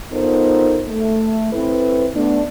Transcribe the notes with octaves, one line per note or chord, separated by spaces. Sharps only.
B3 D#4 F4 A4 A#4 C5
A3
C4 E4 A4 B4
A3 B3 D4